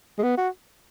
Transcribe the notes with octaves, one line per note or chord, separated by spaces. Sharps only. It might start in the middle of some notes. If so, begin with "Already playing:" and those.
G#3
B3
F#4